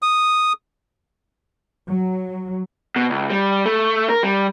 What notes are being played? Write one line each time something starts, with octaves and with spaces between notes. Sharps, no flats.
D#6
F#3
B2
C#2
G3
A3
A#4
G3